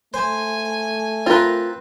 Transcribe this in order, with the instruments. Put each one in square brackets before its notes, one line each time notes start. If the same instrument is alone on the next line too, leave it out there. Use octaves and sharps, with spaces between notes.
[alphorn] A3 [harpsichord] C5 [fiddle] G#5
[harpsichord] C4 B4 [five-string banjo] F4 A#4